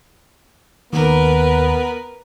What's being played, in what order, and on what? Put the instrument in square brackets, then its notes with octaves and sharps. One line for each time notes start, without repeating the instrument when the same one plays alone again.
[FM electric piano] D#2 [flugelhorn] B3 [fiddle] A#4 B4